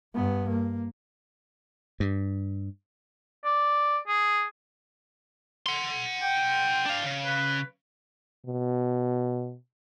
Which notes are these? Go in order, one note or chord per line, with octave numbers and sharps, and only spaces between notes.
G2 B3
A#3
G2
D5
G#4
F#5 C6
G5
D4 F5
C#3
B4
B2